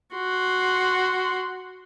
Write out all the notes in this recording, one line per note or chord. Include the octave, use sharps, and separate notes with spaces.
F#4 C6